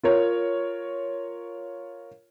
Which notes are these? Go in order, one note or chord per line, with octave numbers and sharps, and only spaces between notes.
F4 A#4 C#5